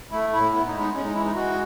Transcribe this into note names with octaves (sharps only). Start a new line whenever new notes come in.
A3 E4
A2 E4
B3 E4
D#4
G#3
D#4
G#3 C#4
D#4
E3 E4
D#4
G#3 F#4